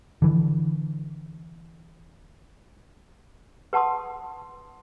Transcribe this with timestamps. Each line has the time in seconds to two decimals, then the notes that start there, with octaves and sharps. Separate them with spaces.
0.22 D3 E3
3.73 B4 F#5 A5 C6 D#6